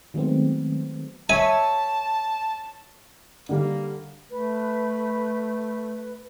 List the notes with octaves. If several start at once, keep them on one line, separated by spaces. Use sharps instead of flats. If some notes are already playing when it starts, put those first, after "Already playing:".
D#3 F#3 G#3 A3 B3 C4
C#5 E5 G#5 A5
D3 G3 A#3
A3 B4